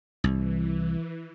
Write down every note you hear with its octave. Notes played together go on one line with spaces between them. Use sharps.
C2 E3